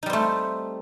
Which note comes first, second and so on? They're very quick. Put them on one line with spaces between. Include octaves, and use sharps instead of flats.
D#4 G3 C4 A3